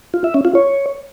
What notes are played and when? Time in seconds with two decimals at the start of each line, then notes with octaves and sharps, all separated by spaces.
0.14 F4
0.24 E5
0.34 C#4
0.45 F4
0.55 C#5